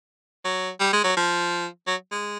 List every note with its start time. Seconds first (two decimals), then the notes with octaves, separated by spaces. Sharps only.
0.45 F#3
0.80 G3
0.93 G#3
1.04 F#3
1.17 F3
1.87 F#3
2.12 G#3